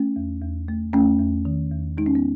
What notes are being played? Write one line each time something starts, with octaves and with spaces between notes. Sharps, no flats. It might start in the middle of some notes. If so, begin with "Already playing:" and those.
Already playing: A3 C#4
E2
E2
A3
E2 A3 C#4
E2
D#3
E2
G#3 D#4
C#4
B3